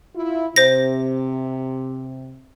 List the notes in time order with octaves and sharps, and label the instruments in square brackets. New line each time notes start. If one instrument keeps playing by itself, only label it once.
[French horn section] E4 F4
[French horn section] C3 [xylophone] C5 A#6